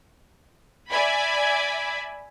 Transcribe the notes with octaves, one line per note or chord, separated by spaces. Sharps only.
D5 E5 G#5 B5